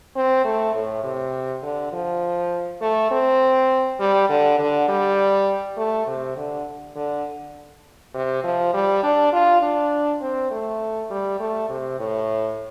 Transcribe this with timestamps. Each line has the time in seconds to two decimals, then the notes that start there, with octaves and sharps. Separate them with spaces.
0.15 C4
0.44 A3
0.74 A2
1.04 C3
1.63 D3
1.92 F3
2.81 A3
3.11 C4
4.00 G3
4.29 D3
4.59 D3
4.88 G3
5.77 A3
6.07 C3
6.37 D3
6.96 D3
8.14 C3
8.44 F3
8.74 G3
9.03 D4
9.33 F4
9.62 D4
10.21 C4
10.51 A3
11.10 G3
11.39 A3
11.69 C3
11.99 A2